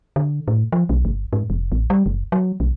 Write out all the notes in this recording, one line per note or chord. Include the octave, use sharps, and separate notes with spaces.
D3
A2
F3
B1
G1
G#2
F1
A1
G3
F#1
F#3
B1